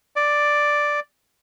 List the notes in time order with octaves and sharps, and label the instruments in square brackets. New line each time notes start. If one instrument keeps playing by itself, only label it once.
[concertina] D5